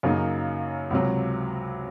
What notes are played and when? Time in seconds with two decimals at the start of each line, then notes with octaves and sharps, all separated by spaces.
0.03 F#2 C#3 F#3 A#3 D#4
0.90 C#2 C3 F#3